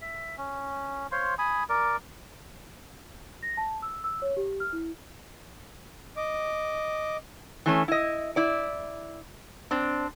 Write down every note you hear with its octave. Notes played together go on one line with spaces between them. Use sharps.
E5
C#4
C5 C#5 F5 C6
G#5 B5 D#6
A#4 D5
A#6
A5
E6
E6
C#5
G4
F6
E4
D#5 D6
E3 A3 C#4
E4 D#5
E4 D5
C4 D4